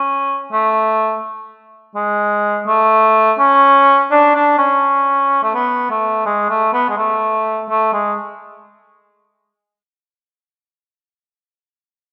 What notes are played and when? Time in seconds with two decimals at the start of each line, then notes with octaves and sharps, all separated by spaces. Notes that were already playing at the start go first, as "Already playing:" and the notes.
Already playing: C#4
0.52 A3
1.95 G#3
2.67 A3
3.39 C#4
4.11 D4
4.35 D4
4.58 C#4
5.43 A3
5.54 B3
5.90 A3
6.26 G#3
6.49 A3
6.73 B3
6.90 G#3
6.97 A3
7.69 A3
7.93 G#3